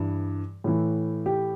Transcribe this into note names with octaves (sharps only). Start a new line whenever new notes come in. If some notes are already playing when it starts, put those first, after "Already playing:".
Already playing: G2 E3
A2 E3
G4